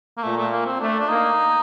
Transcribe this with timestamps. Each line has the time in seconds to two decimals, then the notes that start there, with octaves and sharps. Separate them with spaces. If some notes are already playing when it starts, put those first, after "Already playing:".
0.17 A#3
0.23 A#2 A3
0.37 A3
0.52 A#3
0.66 C4
0.80 A3 D4
0.99 D4
1.09 A#3 D#4